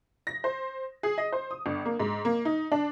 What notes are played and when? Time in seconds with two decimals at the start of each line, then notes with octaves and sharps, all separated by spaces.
0.27 A#6
0.44 C5
1.03 G#4
1.18 D#5
1.32 C5
1.51 D#6
1.66 G1
1.85 A#3
2.00 G#2
2.25 A#3
2.45 D#4
2.72 D4